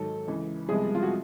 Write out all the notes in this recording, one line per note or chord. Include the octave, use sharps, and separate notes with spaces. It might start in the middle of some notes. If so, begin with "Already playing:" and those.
Already playing: G#2 D#3 F#3 A4
C#2 C#3 E3
C2 C3 F3 G#3 B3 G#4
F4
F#4